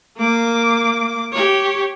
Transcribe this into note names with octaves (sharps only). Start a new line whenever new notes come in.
A#3 D6
G4 C#5